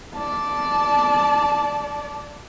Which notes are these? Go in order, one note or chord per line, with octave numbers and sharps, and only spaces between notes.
D5 A5